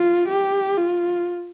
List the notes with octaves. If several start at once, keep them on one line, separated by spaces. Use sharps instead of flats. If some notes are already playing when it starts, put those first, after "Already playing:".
Already playing: F4
G4
F4